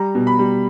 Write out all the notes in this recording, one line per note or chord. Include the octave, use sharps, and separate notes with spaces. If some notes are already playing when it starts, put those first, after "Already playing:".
Already playing: G3 A#5
B2
B5
G3